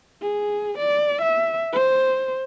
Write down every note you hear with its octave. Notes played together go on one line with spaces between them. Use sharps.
G#4
D5
E5
C5